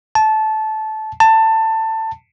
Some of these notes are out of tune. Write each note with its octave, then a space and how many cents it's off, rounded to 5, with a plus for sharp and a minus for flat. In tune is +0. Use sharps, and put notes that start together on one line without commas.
A5 -15
A5 +20